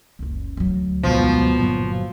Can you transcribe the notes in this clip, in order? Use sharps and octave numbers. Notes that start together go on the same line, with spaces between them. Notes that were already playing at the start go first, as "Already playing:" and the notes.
F#1 C#2
D2 F#3
B1 G#2 B2 F3
G1 A#2 F#3